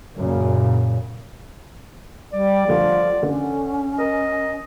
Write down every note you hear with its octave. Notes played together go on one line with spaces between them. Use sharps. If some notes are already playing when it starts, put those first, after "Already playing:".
F#2 A#2 C#3
G3 D5
D3 F3 G3 A3
D3 C#4
A#4 D#5